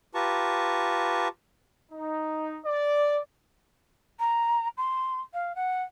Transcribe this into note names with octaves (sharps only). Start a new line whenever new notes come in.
F4 G4 B4 A5 A#5 C#6
D#4
D5
A#5
C6
F5
F#5